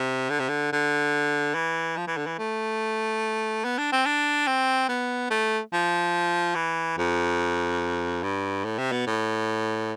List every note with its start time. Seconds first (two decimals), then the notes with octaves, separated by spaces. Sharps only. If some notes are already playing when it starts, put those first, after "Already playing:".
Already playing: C3
0.30 D3
0.40 C3
0.49 D3
0.73 D3
1.55 E3
1.97 F3
2.07 E3
2.17 D3
2.27 E3
2.38 A3
3.64 B3
3.78 D4
3.92 C4
4.06 D4
4.47 C4
4.89 B3
5.31 A3
5.73 F3
6.55 E3
6.98 F2
8.23 G2
8.65 A2
8.78 C3
8.92 B2
9.07 A2